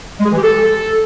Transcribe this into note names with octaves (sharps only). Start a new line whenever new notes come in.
G#3
G#4
E3
G4
A4